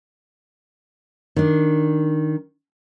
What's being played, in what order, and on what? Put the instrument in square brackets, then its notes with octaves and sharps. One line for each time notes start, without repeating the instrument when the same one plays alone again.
[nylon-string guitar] D#3 D4